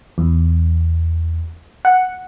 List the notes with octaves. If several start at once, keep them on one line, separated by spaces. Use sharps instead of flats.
E2
F#5